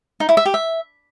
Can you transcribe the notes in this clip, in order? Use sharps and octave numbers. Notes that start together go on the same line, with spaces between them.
D#4
E4
E5
G4
E5